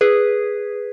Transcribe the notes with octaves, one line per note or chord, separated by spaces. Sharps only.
G#4 B4